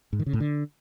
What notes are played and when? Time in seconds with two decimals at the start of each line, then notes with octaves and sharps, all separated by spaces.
0.13 G#2
0.20 D#3
0.26 C#3
0.33 A2
0.40 D3